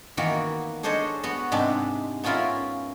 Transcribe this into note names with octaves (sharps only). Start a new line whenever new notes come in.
D#3 E3 A#3 B3 E4 F#4
D4 G#4 A4 C5 C#5 D#5
B3 F#4
G#2 C3 G#3 D4 E5
B3 C#4 E4 F4 A#4 E5